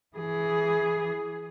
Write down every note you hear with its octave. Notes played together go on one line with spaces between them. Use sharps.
E3 G#4